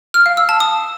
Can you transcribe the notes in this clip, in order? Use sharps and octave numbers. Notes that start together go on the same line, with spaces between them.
F6
F5
E6
A5
D#6